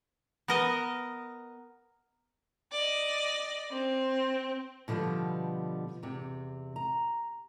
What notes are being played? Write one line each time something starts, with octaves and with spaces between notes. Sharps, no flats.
B3 A#4 D#5
D5 D#5
C4
B2 D3 F3 G3 B3
E2 C3
A#5